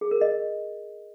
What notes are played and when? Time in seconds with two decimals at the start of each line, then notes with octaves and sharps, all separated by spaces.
0.01 G#4
0.11 A#4
0.21 D#5